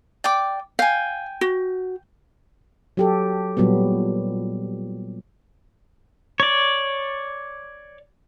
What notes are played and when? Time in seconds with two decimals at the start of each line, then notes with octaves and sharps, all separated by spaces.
0.24 D5 G5 D6
0.79 F5 G5 G#5
1.41 F#4
2.97 F#3 G4 A4
3.57 A#2 F#3 G3 B3
6.40 C#5 D5